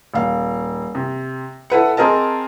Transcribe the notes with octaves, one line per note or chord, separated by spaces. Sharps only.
D#1 F5
C3
E4 A4 B4 F#5
C4 G#4 A#4 D#5 A5